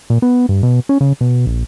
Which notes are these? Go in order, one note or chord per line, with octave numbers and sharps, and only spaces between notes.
A#2
B3
G2
B2
C#4
C#3
B2
A#1